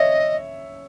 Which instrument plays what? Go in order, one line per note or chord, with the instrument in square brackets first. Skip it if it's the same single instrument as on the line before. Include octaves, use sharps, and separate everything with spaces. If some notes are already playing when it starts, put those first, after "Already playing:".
Already playing: [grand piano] C#5 E5 [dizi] D#5